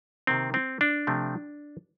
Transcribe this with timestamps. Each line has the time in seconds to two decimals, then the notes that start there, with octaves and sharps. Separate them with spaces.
0.27 C3 D#3 A#3 C4
0.54 C4
0.81 D4
1.07 C3 F3 A3 C4